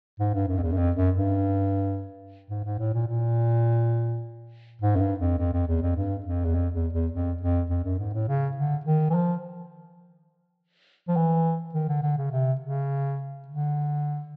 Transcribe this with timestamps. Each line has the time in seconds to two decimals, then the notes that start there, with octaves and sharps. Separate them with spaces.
0.20 G#2
0.34 G2
0.48 F#2
0.58 F2
0.63 E2
0.72 F#2
0.77 F2
0.96 F#2
1.15 G2
2.50 G#2
2.65 G#2
2.79 A2
2.94 A#2
3.08 A#2
4.82 G#2
4.96 F#2
5.01 G2
5.20 F2
5.39 F2
5.53 F2
5.68 E2
5.82 F2
5.97 G2
6.26 F2
6.45 E2
6.55 F2
6.74 E2
6.93 E2
7.12 F2
7.41 F2
7.70 F2
7.84 F#2
7.99 G#2
8.13 A2
8.28 C#3
8.57 D3
8.86 D#3
9.10 E3
9.15 F3
11.08 F3
11.16 E3
11.74 D#3
11.89 D3
12.03 D3
12.18 C#3
12.32 C3
12.61 C#3
13.48 D3